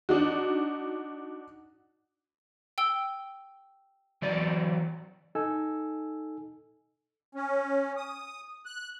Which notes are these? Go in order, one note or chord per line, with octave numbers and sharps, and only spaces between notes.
D4 D#4 F#4
G5 E6 G7
E3 F#3 D5
D#4 A4 G#5 E6
C#4
D#6
F#6